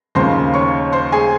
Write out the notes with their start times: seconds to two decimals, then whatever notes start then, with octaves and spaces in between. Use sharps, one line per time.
0.15 D#2 C#3 F3 A#3 C5 C6
0.54 C#5 C#6
0.92 C5 C6
1.12 G#4 G#5